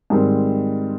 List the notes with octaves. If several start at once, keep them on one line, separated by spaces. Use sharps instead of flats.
G#2 D#3 G3 C4